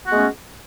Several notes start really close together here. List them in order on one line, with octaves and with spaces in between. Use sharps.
F#4 B3 G#3 A3 C#4